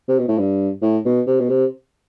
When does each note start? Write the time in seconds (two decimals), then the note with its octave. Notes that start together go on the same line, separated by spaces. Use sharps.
0.08 C3
0.19 B2
0.28 A2
0.39 G2
0.82 A2
1.05 B2
1.27 C3
1.40 B2
1.49 C3